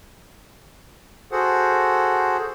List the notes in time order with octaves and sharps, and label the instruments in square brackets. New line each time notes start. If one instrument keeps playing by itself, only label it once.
[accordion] F#4 G#4 A4 C5 F#5